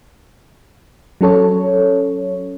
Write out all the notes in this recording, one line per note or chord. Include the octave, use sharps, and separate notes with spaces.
F#3 C#4 A4 C#5